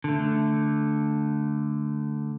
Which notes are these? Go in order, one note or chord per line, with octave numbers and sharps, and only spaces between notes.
D3 A3